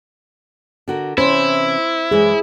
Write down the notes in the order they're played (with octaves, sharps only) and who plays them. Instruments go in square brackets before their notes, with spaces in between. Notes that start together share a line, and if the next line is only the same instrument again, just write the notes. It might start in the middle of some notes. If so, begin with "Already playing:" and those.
[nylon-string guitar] D3 F#4 A#4
[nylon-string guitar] C3 E3 C#4 [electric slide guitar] E4 [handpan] C5
[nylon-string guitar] F#2 E3 G#3 [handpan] G#4